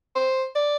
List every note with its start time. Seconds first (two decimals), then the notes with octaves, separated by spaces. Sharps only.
0.16 C5
0.55 D5